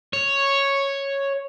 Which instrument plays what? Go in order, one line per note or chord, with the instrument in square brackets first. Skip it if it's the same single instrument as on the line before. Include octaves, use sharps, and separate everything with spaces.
[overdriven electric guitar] C#5